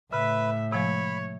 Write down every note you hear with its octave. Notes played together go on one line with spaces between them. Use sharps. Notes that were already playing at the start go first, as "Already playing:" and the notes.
A2 C#3 B4 E5
C3 F3 G#3 C#5 B5